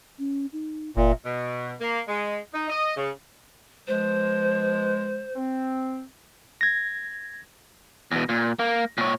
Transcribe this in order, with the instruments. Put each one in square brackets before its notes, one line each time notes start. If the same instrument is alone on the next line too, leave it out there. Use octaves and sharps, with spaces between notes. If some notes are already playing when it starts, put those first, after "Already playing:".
[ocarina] C#4
D#4
[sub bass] F#1 [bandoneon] A#2 [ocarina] E5
[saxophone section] B2
A#3
G#3
D#4
D#5
C#3
[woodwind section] B2 F3 G#3 [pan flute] C5
[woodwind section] C4
[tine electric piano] G#6 A#6
[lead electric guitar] E2 B2
A#2
A#3
A#2 C#5